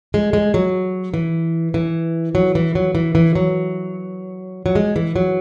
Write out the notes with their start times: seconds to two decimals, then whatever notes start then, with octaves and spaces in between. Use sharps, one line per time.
0.14 G#3
0.33 G#3
0.54 F#3
1.14 E3
1.74 E3
2.35 F#3
2.55 E3
2.75 F#3
2.95 E3
3.15 E3
3.35 F#3
4.66 F#3
4.75 G#3
4.96 E3
5.16 F#3